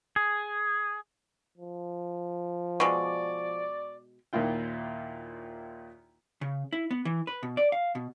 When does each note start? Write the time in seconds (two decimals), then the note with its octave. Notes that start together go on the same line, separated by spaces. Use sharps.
0.16 G#4
1.58 F3
2.80 B2 G#3 D5 C#6
4.33 D#2 A#2 A#3 E4 F4 G5
6.41 C#3
6.73 E4
6.91 B3
7.05 E3
7.27 B4
7.43 B2
7.57 D5
7.72 F5
7.95 B2